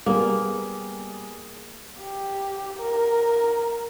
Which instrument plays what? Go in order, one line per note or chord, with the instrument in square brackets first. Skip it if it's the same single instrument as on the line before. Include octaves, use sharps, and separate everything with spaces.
[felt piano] G3 B3 G#4 [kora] A#3
[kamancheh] G4
A#4